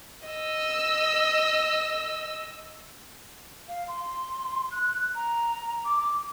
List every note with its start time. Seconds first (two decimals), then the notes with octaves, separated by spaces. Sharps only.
0.27 D#5 E6
3.69 F5
3.88 C6
4.71 F#6
5.15 A#5
5.85 D6